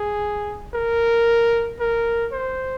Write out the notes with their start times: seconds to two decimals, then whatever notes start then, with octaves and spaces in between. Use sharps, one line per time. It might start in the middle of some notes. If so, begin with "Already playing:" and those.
Already playing: G#4
0.74 A#4
1.80 A#4
2.32 C5